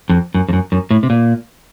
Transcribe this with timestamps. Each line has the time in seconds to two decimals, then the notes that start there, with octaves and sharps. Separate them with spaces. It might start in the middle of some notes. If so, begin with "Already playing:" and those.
0.09 F2
0.34 F#2
0.48 F2
0.53 F#2
0.72 F#2
0.91 A2
1.03 C3
1.10 A#2